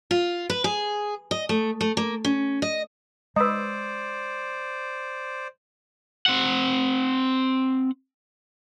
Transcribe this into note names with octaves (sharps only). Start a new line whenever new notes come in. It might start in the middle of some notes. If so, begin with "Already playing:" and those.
F4
B4
G#4
D#5
A3
A3
A#3
C#4
D#5
G#3 D#4 B4 C5 D5 D#6 E6
C4 F#5